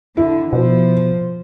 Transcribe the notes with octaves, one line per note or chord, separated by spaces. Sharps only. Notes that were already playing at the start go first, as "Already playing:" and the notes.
D3 E4
B2 F3 C5